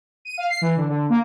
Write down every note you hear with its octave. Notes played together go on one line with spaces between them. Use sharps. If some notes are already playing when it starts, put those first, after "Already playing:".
D#7
F5
C7
E3
D3
D3
A#3